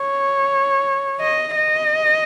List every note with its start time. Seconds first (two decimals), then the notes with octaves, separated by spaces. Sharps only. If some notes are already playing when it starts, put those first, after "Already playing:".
Already playing: C#5
1.21 D#5
1.56 D#5